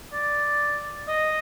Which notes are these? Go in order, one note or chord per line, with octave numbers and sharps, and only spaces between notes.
D5
D#5